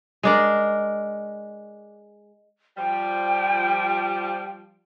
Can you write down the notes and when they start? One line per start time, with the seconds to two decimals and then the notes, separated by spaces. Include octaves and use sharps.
0.23 G#3 D4 A#4
2.77 F3 G3 G5